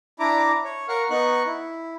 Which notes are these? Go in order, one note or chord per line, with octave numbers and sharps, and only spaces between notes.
D4 E4 A#5 D6
C#5
A#4 F5 F#5 C#6 F6
B3 D#4 C#6 F#6
E4